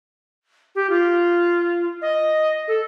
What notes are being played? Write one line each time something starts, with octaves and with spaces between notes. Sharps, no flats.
G4
F4
D#5
A4